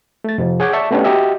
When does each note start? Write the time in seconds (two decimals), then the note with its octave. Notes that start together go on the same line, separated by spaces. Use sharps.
0.24 A3 A6
0.38 F2 C3 F3
0.60 G#4 C#5 F#5 G#5 D6 G6
0.73 D5 E5 A5 C#6
0.91 A3 B3 C#4 D4 G4
1.04 F#4 G4 D#5 E5